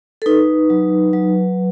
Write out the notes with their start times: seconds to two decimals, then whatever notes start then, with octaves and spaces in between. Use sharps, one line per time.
0.22 A4
0.26 D#4 B4
0.70 F#3
1.13 F#3